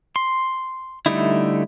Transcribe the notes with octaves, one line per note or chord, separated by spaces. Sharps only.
C6
D3 G3 A3 D#4 E4